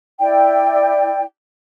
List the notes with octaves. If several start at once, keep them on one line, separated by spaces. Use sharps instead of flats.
E4 D5 G5